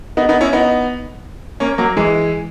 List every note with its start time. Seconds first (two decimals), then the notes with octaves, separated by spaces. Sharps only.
0.17 B3 D#4
0.29 B3 D#4
0.41 C#4 E4
0.53 B3 D#4
1.60 A#3 C#4
1.78 F#3 A#3
1.97 E3 G#3